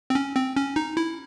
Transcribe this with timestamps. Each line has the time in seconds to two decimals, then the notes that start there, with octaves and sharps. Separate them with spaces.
0.10 C4
0.15 C#4
0.36 C4
0.56 C#4
0.76 D#4
0.97 E4